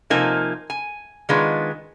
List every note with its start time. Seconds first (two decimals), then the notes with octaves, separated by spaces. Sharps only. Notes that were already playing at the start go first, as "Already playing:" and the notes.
0.10 C3 F3 A#3 D#4 G#5
0.70 G#5
1.29 D#3 G#3 B3 D4 F4